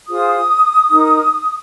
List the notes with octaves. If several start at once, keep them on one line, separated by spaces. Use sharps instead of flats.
F4 G#4 C5 D#6
D#4 A#4